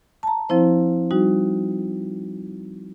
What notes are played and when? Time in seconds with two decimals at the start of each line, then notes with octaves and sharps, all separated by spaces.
0.23 A5 A#5
0.49 F3 C4 E4 C5
1.11 G3 D#4 F#4